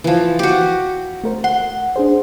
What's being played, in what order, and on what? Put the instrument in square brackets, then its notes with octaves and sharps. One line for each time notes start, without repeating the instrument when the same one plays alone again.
[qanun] E3 F3
F#4 G4
[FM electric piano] A3 A#4 C5
[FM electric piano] F#5 [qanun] C6
[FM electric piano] D4 G#4 C5